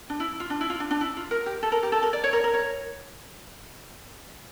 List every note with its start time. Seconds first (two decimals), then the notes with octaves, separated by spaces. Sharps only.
0.10 D4
0.20 E4
0.40 F4
0.50 D4
0.61 E4
0.70 F4
0.80 D4
0.91 D4
1.01 E4
1.17 F4
1.31 A#4
1.46 G4
1.63 A4
1.72 A#4
1.83 G4
1.92 A4
2.03 A#4
2.13 D5
2.24 C#5
2.33 A#4
2.44 A#4
2.54 C#5